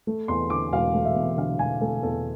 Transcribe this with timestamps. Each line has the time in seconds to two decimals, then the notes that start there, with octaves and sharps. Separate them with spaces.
0.07 A3
0.28 E2 C6
0.50 D3 D6
0.72 E1 F5
0.94 A3
1.05 E5
1.16 E2
1.37 D3 F5
1.59 E1 G#5
1.81 A3 A4
2.03 E2 A4